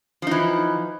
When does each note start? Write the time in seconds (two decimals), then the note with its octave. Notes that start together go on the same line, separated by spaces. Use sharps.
0.22 F3
0.27 D#4
0.31 E3